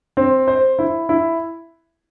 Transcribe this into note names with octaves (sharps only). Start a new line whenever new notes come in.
C4
C5
E4
E4